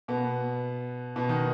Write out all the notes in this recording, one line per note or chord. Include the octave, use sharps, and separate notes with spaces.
B2 B3
B2 B3
D#3 D#4